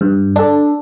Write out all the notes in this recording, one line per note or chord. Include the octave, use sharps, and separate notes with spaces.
G2
D4 A4